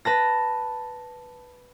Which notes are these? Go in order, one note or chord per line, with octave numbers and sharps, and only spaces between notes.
B4 A5 A#6